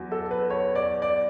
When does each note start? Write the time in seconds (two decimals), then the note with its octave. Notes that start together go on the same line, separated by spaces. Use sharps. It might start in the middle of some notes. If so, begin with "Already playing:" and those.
Already playing: E2 F#3
0.11 A4
0.31 B4
0.50 C#5
0.75 D5
1.02 D5